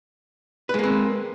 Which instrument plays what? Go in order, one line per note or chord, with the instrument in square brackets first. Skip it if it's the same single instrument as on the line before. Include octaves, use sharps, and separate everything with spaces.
[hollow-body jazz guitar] B4
G#3
A#3
C4